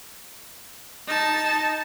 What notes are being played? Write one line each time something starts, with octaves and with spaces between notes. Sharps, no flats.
D#4 A5